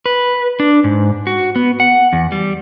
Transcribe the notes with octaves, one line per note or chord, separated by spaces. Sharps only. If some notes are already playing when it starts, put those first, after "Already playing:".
B4
D4
G#2
F#4
B3
F#5
E2
G3